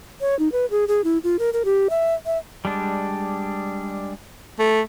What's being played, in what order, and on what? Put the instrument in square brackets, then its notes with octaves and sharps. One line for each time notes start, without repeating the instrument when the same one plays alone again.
[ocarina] C#5
D#4
B4
G#4
G#4
E4
F4
A#4
A#4
G4
E5
E5
[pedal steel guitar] G3 G#3 D4
[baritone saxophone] A3